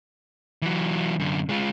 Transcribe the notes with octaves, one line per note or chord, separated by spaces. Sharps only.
E3 F#3
F#2 D3
G#3 F4